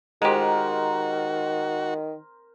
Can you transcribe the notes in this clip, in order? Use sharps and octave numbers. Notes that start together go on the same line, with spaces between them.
D#3 G#3 F#4 G4 A#4 C5